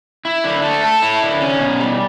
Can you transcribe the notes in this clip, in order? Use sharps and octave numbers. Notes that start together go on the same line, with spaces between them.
E4
D3
A3
A4
E4
D3
C#4
B2
G3